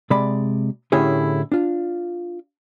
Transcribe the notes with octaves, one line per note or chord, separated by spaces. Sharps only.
C3 G#3 D5 B5
A2 D3 C#4 E4 G4 G#4
D4 F4